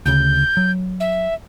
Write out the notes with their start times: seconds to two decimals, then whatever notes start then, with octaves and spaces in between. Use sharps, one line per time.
0.06 D2 C#3 G6
0.57 F#3
1.00 E5